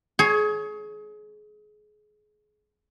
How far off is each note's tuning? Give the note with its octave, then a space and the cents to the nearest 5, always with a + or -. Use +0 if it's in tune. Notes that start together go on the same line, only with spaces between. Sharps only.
G#4 +30 C#5 +0